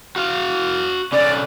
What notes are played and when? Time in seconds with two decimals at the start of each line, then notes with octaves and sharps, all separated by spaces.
0.16 F#4 F5
1.12 D3 C#4 D5